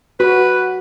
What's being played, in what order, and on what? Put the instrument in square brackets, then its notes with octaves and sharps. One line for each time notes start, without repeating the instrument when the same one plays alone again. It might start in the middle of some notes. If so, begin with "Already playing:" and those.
[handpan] F#4 [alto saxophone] B4